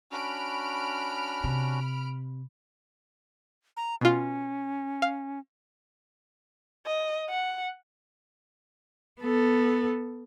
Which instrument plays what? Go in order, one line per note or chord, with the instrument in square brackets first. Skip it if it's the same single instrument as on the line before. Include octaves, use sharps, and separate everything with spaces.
[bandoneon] C#4 D4 F#4 [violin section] B5 F6 D7
[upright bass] C3
[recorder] A#5
[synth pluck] B2 F4 [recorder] C#4
[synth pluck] F5
[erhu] D#5
F#5
[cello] B3 A4